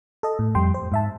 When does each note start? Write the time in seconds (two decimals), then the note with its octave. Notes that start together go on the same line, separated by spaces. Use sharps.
0.23 A4 D#5
0.39 A2
0.55 F2 G3 G5 C6
0.74 C5
0.92 G#2 E5 A5